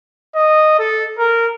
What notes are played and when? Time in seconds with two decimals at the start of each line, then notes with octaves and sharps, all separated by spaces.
0.35 D#5
0.79 A4
1.18 A#4